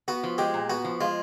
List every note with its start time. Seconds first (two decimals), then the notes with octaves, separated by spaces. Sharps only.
0.08 B3 F#4
0.23 F3
0.38 G#3 G4
0.54 A#2
0.69 B3 F#4
0.84 F3
1.00 G#3 F4